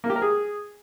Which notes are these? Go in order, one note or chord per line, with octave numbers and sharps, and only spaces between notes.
A#3
G4
A#4
G#4